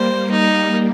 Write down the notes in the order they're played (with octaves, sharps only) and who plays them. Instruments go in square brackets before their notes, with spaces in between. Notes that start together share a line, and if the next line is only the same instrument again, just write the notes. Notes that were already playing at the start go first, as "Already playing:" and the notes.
Already playing: [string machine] G3 A#3 [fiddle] C5
[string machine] G3 [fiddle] D#4